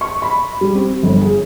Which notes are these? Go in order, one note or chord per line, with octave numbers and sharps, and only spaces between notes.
C#6
B5
G3
C4
G1
G#4